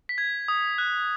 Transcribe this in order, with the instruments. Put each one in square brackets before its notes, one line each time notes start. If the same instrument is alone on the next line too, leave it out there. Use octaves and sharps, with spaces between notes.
[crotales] B6
G#6
D#6
F#6